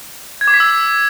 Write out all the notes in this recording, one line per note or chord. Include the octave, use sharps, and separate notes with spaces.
G#6
D6
B6
E6